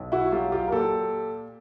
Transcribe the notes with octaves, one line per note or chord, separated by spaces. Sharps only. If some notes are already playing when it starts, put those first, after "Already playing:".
Already playing: B1
E4 F#4
F#3 F4 G4
F4 G4
A#4
A#2 G4 A4